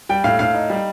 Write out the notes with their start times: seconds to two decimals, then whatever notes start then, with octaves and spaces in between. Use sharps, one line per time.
0.09 G3 G5
0.24 A2 F5
0.39 A2 F5
0.54 D#4
0.70 G3